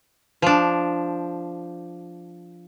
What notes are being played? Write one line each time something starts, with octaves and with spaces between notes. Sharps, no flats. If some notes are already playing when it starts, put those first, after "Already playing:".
F3 D4